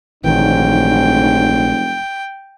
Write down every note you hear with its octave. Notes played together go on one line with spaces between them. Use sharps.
F1 A#1 G#2 D#3 E3 F#3 D4 G5